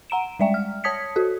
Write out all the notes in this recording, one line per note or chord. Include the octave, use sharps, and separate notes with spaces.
F#5 A#5 D7 E7
G3 G#3 D5 E5 G5
F6
C#5 A5 D#6 G#6 B6 C#7
F#4 A4